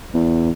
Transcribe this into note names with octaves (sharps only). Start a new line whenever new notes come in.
E2